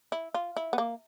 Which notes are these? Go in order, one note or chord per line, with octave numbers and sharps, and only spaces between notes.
E4
F4
E4
B3
A#3